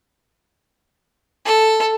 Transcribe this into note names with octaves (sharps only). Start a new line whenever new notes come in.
A4